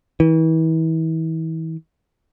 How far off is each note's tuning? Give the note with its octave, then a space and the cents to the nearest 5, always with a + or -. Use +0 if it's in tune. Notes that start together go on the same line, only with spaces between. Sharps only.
E3 -35